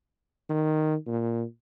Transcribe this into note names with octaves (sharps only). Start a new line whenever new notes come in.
D#3
A#2